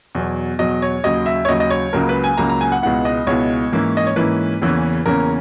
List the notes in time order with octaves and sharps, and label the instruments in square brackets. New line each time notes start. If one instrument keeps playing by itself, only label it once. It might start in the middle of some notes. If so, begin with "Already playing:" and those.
[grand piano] E2 B2 F#3
E2 B2 F#3 D#5
C#5
D#2 C#3 F#3 D#5
E5
C#5
D#2 C#3 F#3 D#5
D#5
C#5
C#2 C#3 F#3 A#3 A#4
B4
G#5
C#2 C#3 F#3 A#3 A#5
A#5
G#5
F#5
C#2 B2 G#3 B3 E4 F#5
D#5
C#2 B2 G#3 B3 E4 C#5
G#2 E3 A#3 C#4 E4
D#5
C#5
G#2 E3 A#3 C#4 E4 B4
E2 C#3 E3 A#3 C#4
E2 C#3 E3 A#3 C#4 A#4